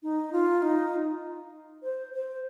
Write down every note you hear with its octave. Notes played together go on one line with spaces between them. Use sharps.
D#4
F4
D#4
C5
C5